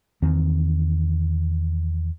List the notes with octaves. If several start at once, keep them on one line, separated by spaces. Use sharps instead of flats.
E2 D#3 C4